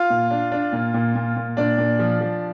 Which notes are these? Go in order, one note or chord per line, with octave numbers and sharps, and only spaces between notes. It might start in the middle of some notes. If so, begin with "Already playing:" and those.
Already playing: F4 F5
A#2
D4
D4
A#2
A#2
A#2
A#2
A#2 D4 D5
A#2
F3
F3